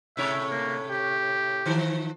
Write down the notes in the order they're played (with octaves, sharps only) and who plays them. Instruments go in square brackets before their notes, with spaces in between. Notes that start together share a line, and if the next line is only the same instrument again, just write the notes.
[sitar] A2 C3 C#5 [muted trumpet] E5
[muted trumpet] A#3
G4
[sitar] D#3 F3